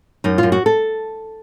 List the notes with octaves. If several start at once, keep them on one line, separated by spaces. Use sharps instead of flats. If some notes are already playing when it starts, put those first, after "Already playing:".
F#2 D#4
F#2 F4
F#4
A4